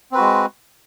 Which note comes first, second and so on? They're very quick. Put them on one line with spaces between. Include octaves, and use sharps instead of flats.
C4 B4 F#4 G#3